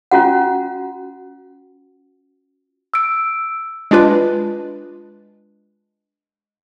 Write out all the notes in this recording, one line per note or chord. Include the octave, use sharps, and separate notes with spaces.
C#4 F4 F#4 F#5
E6 D7
G#3 D4 F4 B4